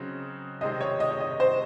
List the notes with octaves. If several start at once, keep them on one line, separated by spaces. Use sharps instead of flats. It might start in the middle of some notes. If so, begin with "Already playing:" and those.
Already playing: C#3 F#3 C4 D#4
C3 D#3 G#3 C4 D#5
C#5
D#5
C#5
D#5
C5